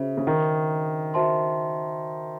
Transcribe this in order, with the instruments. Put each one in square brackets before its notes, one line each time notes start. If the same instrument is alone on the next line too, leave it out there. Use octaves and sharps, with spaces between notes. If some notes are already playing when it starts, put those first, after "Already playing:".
Already playing: [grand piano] C#3 [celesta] F#4 C5 E5
[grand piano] C#3
D#3
[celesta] F#4 C5 E5 A5 C6